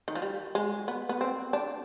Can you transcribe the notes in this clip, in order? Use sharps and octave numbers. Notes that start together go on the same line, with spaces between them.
D#3
F3
G3
G#3
B3
B3
C4
D4